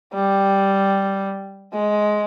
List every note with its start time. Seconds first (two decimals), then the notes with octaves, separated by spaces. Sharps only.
0.13 G3
1.73 G#3